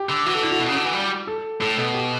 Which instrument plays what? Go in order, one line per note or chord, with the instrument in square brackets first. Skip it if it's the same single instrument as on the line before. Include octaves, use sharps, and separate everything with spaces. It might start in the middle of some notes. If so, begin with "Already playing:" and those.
Already playing: [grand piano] G4
[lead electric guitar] D3
[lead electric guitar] E3 [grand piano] F#4
[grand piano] A4
[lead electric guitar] D3 [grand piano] E4
[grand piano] F#4
[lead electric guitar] B2
C#3
D3
E3
G3
[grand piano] A4
[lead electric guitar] A2 [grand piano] A4
[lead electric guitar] B2 [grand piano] A4
[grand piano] G4